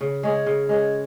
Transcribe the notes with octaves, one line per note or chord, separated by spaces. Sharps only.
C#3
G#3 C#4 G#4
C#3
G#3 C#4 G#4